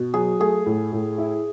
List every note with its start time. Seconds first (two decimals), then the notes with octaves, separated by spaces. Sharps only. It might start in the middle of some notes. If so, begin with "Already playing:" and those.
Already playing: B2
0.14 F#3 G#4
0.40 A3 G#4
0.66 A2
0.92 A2
1.18 E4